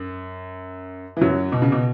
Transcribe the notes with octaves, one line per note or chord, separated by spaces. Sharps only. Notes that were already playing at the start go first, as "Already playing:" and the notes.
Already playing: F#2
E3
F#2 F#3
B2
C#3
B2